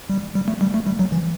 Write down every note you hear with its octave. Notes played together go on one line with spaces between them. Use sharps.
G3
G3
A3
G3
A3
G3
F#3
E3